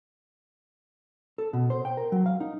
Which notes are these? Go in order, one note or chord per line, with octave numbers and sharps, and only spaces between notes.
A4
B2
C5
G5
A#4
F#3
F5
D#4